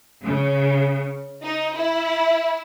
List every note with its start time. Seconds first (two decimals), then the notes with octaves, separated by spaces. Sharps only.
0.24 C#3
1.43 D#4
1.75 E4